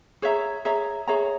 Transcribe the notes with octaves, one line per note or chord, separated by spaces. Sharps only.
G#4 C#5 E5 A#5
G#4 C#5 E5 A#5
G#4 C#5 E5 A#5